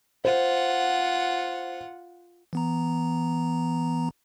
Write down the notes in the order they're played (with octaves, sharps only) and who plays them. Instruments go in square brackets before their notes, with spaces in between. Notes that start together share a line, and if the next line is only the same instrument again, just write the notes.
[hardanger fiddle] F4 F#5 [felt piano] C5
[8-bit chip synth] E3 B3 A#5